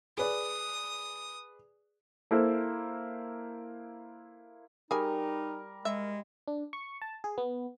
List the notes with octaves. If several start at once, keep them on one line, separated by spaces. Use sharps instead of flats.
G#4 B4 D5 D#6
A#3 E4 A4 C5
G3 D#4 G#4 A#4 G#5 D6
G#3 E5
D4
C#6
A5
G#4
B3